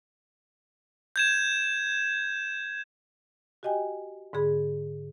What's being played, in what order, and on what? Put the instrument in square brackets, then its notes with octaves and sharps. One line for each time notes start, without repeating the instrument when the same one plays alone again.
[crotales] G6 G#6 E7
[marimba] F#4 G4 D#5 G5 G#5
G#2 D3 G#4 B5